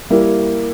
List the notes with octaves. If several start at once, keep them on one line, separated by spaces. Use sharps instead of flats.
G3 A#3 E4